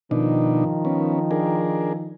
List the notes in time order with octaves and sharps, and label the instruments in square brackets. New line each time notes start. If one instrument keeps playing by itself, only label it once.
[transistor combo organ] B2 D4 D#4 [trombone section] D#3 F3
[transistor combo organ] B3 C#4
D4 G#4 A#4